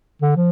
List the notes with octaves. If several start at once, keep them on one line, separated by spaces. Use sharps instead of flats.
D3
F3